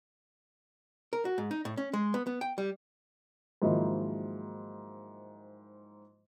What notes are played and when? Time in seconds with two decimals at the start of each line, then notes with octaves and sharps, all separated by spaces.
1.13 A#4
1.25 F#4
1.38 G#2
1.51 D#4
1.65 A2
1.77 C#4
1.93 G#3
2.14 B3
2.27 B3
2.41 G5
2.58 G3
3.62 G#2 D#3 F3 F#3 A#3 E4